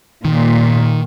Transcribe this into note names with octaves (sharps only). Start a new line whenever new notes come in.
A#2 D#3